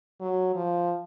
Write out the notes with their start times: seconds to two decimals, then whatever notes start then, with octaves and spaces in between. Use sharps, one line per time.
0.21 F#3
0.55 F3